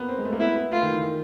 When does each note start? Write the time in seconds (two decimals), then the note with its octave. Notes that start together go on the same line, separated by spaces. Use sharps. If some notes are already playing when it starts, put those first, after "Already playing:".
Already playing: A#3 B3
0.09 C4
0.18 G#3
0.25 A3
0.33 A#3
0.40 B3 E4
0.56 B3
0.72 A3 F4
0.82 D#3
0.92 E3
1.02 D#3